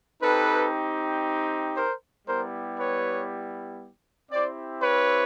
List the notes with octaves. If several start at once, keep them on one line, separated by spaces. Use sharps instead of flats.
C4 D#4 G4 A4 B4
A#4 C5
G3 B3 E4 G4 A#4 C5
B4 C#5
C4 E4 G4 C5 D5
B4 C#5